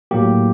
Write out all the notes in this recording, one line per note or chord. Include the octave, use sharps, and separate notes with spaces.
A2 F#3 A#3 G4